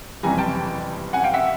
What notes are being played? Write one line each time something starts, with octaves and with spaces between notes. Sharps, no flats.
F#1 F2 C3 E3 G3 G#5 A#5
G5 A5
F#5 G#5
F5 G5
E5 F#5